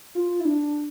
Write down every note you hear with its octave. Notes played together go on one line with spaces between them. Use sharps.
F4
E4
D4